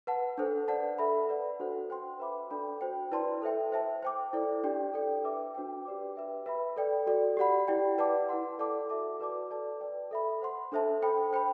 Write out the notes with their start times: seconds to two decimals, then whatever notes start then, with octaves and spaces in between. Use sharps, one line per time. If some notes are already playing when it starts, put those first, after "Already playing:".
0.07 B4 F#5 A5
0.38 D4 A4 C5
0.68 B4 D5 F#5 A5
0.98 A4 E5 B5
1.29 B4 D5 F#5
1.59 D4 F#4 A4 C5 F#5
1.90 C5 G5 C6
2.20 B4 E5 B5 D6
2.50 D4 A4 D5 G5 B5
2.81 F#4 C5 G5
3.11 E4 B4 D5 A5 C6
3.42 A4 C5 E5 G5
3.72 C5 E5 A5
4.03 C5 G5 D6
4.33 E4 A4 D5
4.64 D4 G4 D5 G5
4.94 A4 D5 G5
5.24 B4 E5 G5 D6
5.55 D4 F#4 C5 G5
5.85 G4 B4 D5 G5 D6
6.16 B4 E5 G5
6.46 B4 E5 B5
6.76 A4 D5 G5
7.07 F#4 A4 D5
7.37 G4 D5 F#5 B5
7.68 E4 G4 D5 G5
7.98 B4 D5 F#5 A5 D6
8.29 E4 B4 F#5 C6
8.59 A4 D5 F#5 A5 D6
8.89 F#4 A4 E5 A5 D6
9.20 F#4 B4 D5 A5 D6
9.51 A4 D5 A5
9.81 B4 D5 G5
10.11 A4 E5 B5
10.42 C5 F#5 C6
10.72 D4 A4 C5 E5 A5
11.02 A4 C5 G5 B5
11.33 C5 G5 B5